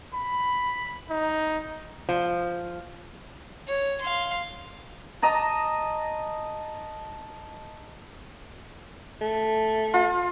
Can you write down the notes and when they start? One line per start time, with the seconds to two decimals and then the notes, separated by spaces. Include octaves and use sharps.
0.14 B5
1.10 D#4
2.09 F3
3.68 C#5
4.01 F5 C6
5.22 D#5 A5 A#5
9.21 A3
9.94 F4